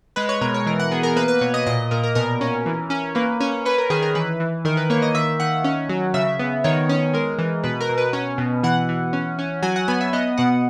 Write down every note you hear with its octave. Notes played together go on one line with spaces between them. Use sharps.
G#3 B4
C#5
B2 A#4
C#5
E3 A#4
F#5
B3 G#4
A#4
A#3 B4
B4
B2 C#5
D#5
A#2 D#5
A#2 A#4
A#4
B2 A#4
C#4
E3
C#4
A#3 B4
C#4
C#4 B4
A#4
D#3 G#4
A#4
E3 B4
E3
D#3 A#4
B4
A#3 C#5
D#5
D#3 E5
D#3 F#5
C#4
F#3
C#3 E5
B3
D#3 C#5
C#4
G#3 A#4
E3
B2 B4
A#4
B2
B4
C#4
B2
E3 F#5
E3
C#4
C#4
F#3 G#5
F#5
B3 G#5
E5
B3 D#5
B2 F#5